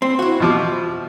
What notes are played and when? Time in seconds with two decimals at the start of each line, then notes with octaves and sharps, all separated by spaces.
0.02 C4
0.19 E4 F#4
0.40 B2 F3 D6